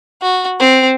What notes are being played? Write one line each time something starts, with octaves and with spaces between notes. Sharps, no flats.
F#4
C4